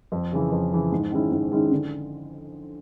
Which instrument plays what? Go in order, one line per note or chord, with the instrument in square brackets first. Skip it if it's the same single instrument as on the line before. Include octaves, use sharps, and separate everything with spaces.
[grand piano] F2
C#3 E3
F2
C#3 E3
G#2
D#3 G#3 C#4 E4
G#2
D#3 G#3 C#4 E4
D3